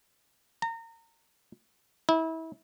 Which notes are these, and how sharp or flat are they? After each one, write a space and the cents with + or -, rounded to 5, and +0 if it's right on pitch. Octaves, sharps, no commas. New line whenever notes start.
A#5 -30
E4 -30